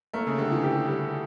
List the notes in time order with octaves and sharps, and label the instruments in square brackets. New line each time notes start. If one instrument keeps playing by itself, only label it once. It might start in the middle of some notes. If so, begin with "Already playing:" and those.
[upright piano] A3 [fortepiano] A#3
[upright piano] C#3
[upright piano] D3 [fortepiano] G3
[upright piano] E3
[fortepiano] G4
G3